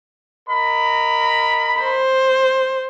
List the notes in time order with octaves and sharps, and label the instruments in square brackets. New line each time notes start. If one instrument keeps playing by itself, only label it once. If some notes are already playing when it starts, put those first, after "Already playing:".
[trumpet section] A#4 D#5 B5
[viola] C5